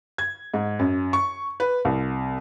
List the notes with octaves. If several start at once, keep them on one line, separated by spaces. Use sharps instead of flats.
G#6
G#2
F#2
C#6
B4
C2